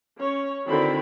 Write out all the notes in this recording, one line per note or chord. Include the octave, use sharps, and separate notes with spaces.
C#4 C#5
D3 D#3 C4 E4 F#4 B5